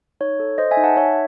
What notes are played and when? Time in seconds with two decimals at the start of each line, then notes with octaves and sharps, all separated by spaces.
0.21 D#4 C#5
0.40 A4
0.58 A4 C5 D#5
0.71 E5 G#5
0.77 D#4
0.84 F#5 A5
0.96 D#4 C#5 E5